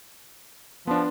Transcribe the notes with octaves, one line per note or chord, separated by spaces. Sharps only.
F3 B3 D4